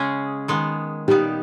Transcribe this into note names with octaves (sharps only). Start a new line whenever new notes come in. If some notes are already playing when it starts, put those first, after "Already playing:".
Already playing: C#3 G#3 C#4 G#4
D#3 G#3 B3
A#2 G3 B3 D#4 G4